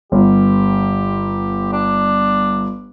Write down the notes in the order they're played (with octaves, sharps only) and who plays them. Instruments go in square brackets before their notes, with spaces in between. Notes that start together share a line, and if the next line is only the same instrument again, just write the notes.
[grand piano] G1 [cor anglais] G4
[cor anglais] D4